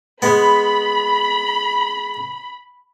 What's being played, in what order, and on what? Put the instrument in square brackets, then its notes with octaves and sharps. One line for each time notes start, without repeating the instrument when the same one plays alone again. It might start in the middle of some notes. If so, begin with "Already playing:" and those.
[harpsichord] G#3 B3 [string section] B5